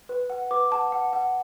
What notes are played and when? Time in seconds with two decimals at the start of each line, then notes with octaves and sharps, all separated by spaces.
0.09 B4
0.30 F#5
0.51 B4 D6
0.71 F#5 A5
0.92 F#5
1.13 F#5